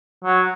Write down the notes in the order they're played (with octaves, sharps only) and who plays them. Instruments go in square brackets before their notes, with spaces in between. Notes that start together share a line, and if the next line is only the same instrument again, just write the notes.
[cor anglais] F#3